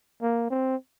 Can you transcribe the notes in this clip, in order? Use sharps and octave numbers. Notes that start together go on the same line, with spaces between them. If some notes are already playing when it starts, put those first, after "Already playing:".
A#3
C4